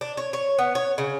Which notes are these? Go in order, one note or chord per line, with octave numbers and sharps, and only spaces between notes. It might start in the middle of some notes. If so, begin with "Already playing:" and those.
D4
C#5
C#5
B3
C#5
C#3